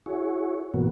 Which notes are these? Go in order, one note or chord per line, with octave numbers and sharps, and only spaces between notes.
E4 F#4 G#4 C#5
G#2 B2 E3 A#3 B3 F#4